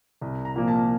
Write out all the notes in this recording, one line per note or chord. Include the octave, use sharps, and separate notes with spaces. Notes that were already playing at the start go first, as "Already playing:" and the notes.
C2
A#5
A#2 F3 A#3
A5